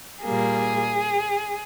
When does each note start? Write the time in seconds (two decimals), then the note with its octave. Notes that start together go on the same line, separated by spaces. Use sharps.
0.22 A#2 G3 A#3 G#4